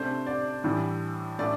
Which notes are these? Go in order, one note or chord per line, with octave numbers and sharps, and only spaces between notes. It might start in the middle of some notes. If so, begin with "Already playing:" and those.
Already playing: C3 A3 D4 C5
D5
A2 E3 G3 D4
A2 A3 D4 D5